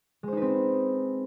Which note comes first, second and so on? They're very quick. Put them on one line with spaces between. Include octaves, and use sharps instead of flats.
G#3 C5 D#4 B4 C4